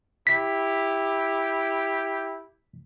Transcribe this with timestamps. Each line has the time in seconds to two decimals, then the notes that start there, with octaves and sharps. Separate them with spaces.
0.27 E4 G4 B6